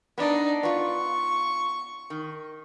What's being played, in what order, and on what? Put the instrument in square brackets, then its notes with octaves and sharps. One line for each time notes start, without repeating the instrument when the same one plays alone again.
[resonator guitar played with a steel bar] B3 D4 [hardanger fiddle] D#4 D5
[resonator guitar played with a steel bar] B3 F4 [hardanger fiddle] C#6
[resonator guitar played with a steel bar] D#3